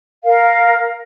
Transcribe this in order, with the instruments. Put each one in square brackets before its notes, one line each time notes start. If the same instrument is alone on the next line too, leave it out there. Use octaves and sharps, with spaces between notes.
[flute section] A#4 F5